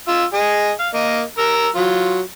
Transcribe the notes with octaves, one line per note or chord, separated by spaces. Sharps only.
F4 E6
G#4 D#5
F5
A#3 D#5
A#4 A#5 E6
F#3 F4